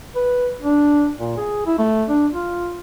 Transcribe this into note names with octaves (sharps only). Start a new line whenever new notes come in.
B4
D4
A#2
G#4
E4
A3
D4
F4